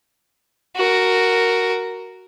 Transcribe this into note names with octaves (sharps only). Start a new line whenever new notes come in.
F#4 A#4